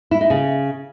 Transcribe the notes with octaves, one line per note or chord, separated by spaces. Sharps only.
E4
D#4
C#3